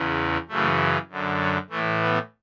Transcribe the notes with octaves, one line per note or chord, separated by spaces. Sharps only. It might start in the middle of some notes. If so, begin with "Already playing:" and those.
Already playing: E2 C#3 E3
F#2 C#3 E3 A3
F#2 D3
F#3
A2 E3 A3
B3